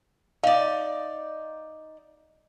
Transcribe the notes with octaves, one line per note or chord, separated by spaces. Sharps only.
D#4 D5 F5